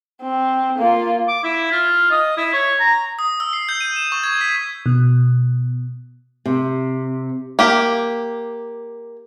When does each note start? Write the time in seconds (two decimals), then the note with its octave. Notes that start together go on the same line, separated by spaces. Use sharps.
0.22 C4
0.78 A#3 F4
1.28 D6
1.43 E4
1.72 F4
2.11 D#5
2.37 E4
2.53 C#5
2.79 A#5
3.19 D#6
3.40 E6
3.53 C7
3.69 G6
3.81 D#7
3.96 E7
4.12 C#6
4.24 G#6
4.41 B6
4.86 B2
6.46 C3
7.59 A#3 G4